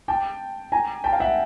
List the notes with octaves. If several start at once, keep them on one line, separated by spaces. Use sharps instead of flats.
G5 A5
G#5 A#5
G5 A5
F5
E5 F#5